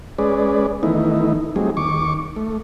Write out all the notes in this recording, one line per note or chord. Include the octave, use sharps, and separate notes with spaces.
G#3 C#4 G#4 B4 D5
D#3 E3 A3 B3 D#4 E4
F#3 G3 A3 C4 D#4 G#4
D#2 C#6 D6
A3